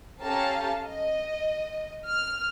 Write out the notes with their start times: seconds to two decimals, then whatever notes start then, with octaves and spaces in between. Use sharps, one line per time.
0.20 C#4 G4 A4 F5 A5 A#5
0.86 D#5
2.06 F6